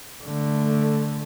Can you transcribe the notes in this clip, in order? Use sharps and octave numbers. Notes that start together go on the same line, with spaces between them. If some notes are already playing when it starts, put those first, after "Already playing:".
D3 A3